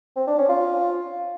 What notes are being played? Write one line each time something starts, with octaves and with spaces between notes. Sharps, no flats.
C4
D4
C#4
F4